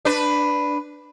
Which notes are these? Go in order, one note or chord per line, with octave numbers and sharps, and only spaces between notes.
D4 B4